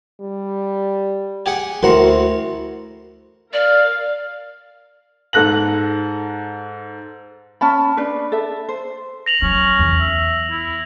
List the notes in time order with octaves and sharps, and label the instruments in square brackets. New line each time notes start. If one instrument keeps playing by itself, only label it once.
[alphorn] G3
[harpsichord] G4 G#4 F#5
[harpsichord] D2 F#5 C6 [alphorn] E4 [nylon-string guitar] F#4 A#4 C5
[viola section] A#4 F5 [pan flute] D5
[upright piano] G#2 A4 F#6 A#6 F#7
[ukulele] C#4 A5 B5
D4 B4
A4 E5
C5
[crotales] A#6 F7 F#7
[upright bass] F#3 [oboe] C#4
[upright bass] E2
[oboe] E5
E4